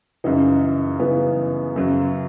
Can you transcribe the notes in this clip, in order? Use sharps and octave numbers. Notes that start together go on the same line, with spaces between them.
F#2 C#3 E3 D#4
F#2 C#3 E3 B3
F#2 C#3 F#3